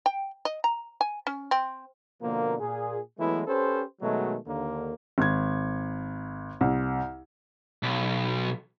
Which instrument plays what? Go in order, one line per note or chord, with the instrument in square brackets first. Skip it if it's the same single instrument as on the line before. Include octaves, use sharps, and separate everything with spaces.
[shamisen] G5
D#5
A#5
G#5
C#4
C4
[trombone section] B2 D3 F3 A#3
A#2 G#4
E3 F#3 G#3 A3 B3 E4
C#4 G4 A4 B4 C5
B2 D#3 F#3 G#3 A3
D#2 D3 A#3
[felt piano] G#1 G#6
C2
[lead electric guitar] B1